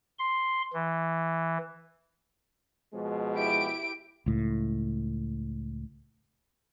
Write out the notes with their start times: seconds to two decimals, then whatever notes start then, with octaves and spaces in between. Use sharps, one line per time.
0.19 C6
0.73 E3
2.93 B2 F3 G#3
3.35 E4 G4 D7
4.26 C#2 A2